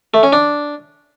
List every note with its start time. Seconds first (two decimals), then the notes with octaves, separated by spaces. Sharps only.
0.14 A3
0.23 C#4
0.33 D4